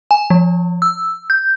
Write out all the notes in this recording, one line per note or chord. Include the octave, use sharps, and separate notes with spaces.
G#5
F3
E6
G6